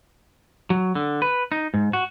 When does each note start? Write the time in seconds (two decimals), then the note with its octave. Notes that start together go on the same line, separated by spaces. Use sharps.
0.70 F#3
0.95 D3
1.22 B4
1.52 D#4
1.74 G#2
1.93 F#4